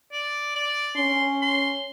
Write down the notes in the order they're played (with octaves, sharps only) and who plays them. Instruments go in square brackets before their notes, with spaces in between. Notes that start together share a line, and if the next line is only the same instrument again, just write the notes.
[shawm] D5
D5
[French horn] C#4 [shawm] C6
[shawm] C6